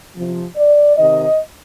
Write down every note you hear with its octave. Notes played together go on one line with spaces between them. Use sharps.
C3 F3
D5
C3 D#3 D#5